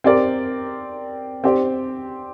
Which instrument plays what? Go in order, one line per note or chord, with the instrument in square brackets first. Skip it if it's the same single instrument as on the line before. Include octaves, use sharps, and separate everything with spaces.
[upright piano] C4 G4 A#4 D5
C4 G4 D5